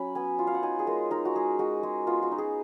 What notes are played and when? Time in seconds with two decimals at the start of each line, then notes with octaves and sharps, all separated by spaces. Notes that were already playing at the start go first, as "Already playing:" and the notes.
Already playing: F#3 C#4 B5
0.15 B3 G#5
0.39 F4
0.47 F5
0.54 F#5
0.63 D#4 G#5
0.79 G#4
0.87 G#3 A#4
1.11 D#4 A#4
1.25 F#4
1.35 G#3 G#4
1.59 G#3 F#4
1.83 G#3
2.07 B3 F4
2.23 F#4
2.31 D#4
2.38 G#4